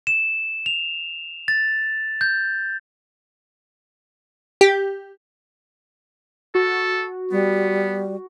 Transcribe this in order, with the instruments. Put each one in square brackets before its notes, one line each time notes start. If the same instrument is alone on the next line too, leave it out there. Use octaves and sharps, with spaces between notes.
[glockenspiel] E7
F7
A6
G6
[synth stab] G4
[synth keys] F#4 [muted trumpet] A4
[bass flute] G3 [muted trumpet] B3